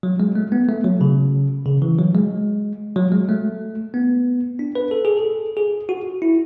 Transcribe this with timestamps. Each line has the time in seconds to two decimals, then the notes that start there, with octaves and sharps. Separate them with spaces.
0.03 F#3
0.20 G#3
0.35 A3
0.52 B3
0.69 A3
0.84 F#3
1.01 C#3
1.66 C#3
1.82 E3
1.99 F#3
2.15 G#3
2.96 F#3
3.12 G#3
3.29 A3
3.94 B3
4.59 D4
4.75 B4
4.91 A4
5.05 G#4
5.17 A4
5.57 G#4
5.89 F#4
6.22 E4